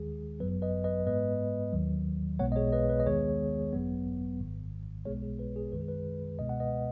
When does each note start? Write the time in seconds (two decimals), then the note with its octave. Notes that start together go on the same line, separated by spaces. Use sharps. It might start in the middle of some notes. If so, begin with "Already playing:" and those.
Already playing: D#2 D#3 G#3 G#4
0.40 G#1 F#2 F#3 B3 B4
0.62 B4 D#5
0.84 B4 D#5
1.06 G#2 G#3 B3 B4 D#5
1.73 D#2 D#3 F#3
2.39 B1 B2 G#3 B3 C#5 F#5
2.52 D#5
2.56 G#4 C#5
2.72 B4 D#5
2.89 B4
3.00 D#5
3.06 D#2 D#3 G#3 B3 G#4 C#5
3.73 G#1 F#2 F#3 B3
4.39 G#1 G#2 D#3
5.05 B1 B2 G#3 B3 G#4 C#5
5.23 G#4
5.39 B4
5.56 G#4
5.72 F#2 D#3 G#3 B4
5.80 G#4
5.88 B4
6.39 C#2 B2 G#3 B3 D#5
6.49 F#5
6.60 B4 D#5